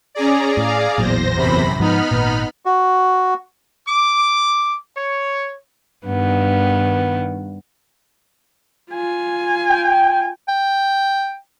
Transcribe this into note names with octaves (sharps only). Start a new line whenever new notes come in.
C#4 G#4 D5 A#5
A2 F5 A#5
A1 E2 A#2 F#3 C5 A#6
F#2 C3 B5
G#2 F3 B3 D#4 B5 F6
G#1 A#2
F#4
D6
C#5
G2 D#3 B3
F4 G#5
G5
G5